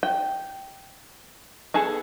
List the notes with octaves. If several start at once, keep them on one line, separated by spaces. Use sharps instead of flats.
G5
B3 G#4 A4